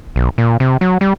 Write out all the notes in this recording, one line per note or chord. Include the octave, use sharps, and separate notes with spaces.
B1
A#2
C3
F#3
G3